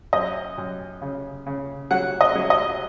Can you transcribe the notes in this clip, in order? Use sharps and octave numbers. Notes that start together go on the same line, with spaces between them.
F#2 D#5
F#2
C#3
C#3
F#3 F#5
D#5
F#3
D#5